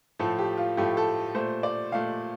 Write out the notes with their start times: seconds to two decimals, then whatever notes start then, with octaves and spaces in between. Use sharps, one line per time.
0.19 A2 F3 A3 A4
0.39 G4
0.57 F4
0.77 A2 F3 A3 G4
0.97 A4
1.34 A#2 A3 C5
1.63 D5
1.92 A#2 A3 F5